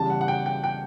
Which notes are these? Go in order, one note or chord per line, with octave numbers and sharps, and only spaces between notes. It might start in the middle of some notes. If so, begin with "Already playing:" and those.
Already playing: E2 C#3 G3 A5
F#5
F#5
G5
G5
G5